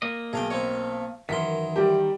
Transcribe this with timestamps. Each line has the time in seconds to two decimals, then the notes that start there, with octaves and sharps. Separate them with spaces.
0.02 A#3 D#5
0.33 B1 G#4 F5 G5
0.50 C4 D#4 C#5
1.29 F#2 D#3 E3 C6 B6
1.76 G3 G4